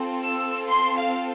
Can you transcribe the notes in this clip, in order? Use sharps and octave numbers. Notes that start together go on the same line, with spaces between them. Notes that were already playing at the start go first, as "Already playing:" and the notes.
Already playing: C4 F4 A4
E6
C6
F5